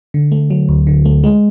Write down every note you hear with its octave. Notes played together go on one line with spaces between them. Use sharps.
D3
A3
F#3
D2
D3
A3
G#3